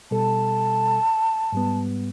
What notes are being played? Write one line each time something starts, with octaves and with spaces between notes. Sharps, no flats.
B2 G3 A4 A5
G#2 G3 B3